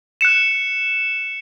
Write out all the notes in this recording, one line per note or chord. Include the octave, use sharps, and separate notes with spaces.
F#6 C#7 E7